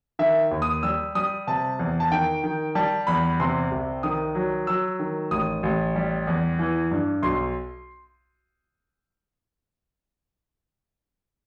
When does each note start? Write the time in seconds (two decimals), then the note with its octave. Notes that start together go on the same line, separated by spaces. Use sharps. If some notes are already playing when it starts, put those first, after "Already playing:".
0.19 D#3 E5
0.51 D#2
0.62 D#6
0.83 G3 E6
1.15 G3 D#6
1.47 C3 A5
1.79 E2
2.00 A5
2.12 D#3 G5
2.44 D#3
2.75 G3 A5
3.07 E2 B5
3.40 C3 C6
3.71 C2
4.03 D#3 D#6
4.35 F#3
4.67 F#3 E6
4.99 D#3
5.31 A1 D#6
5.63 A1
5.96 G3
6.27 E2
6.59 E3
6.91 G2
7.22 B1 C6